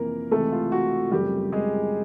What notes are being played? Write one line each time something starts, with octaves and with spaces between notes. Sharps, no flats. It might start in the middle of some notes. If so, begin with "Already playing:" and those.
Already playing: F2 C3 E3 A#3 A#4
C#2 C3 E3 A3 A4
F4
F#4
F#2 C#3 F3 G3 A3 C4 G4
G#3 G#4